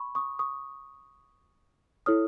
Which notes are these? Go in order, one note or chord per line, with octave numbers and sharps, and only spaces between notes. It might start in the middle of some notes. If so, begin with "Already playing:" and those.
Already playing: B5 C#6
C#6 D#6
C#6 D#6
E4 A4 C#5 D#6 F6